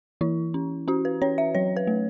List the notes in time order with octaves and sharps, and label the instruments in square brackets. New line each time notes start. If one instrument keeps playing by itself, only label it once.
[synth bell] E3 E4
C#4
C#4 F#4
B4
C#4 C#5
E5
F#3 C#5
B4
A3